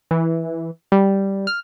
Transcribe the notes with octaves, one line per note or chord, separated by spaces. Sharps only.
E3
G3
F6